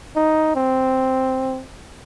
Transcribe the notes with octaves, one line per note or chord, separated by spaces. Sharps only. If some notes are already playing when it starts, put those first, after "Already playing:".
D#4
C4